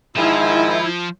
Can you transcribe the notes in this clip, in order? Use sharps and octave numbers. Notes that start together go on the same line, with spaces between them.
G#2 D#3 F3 E4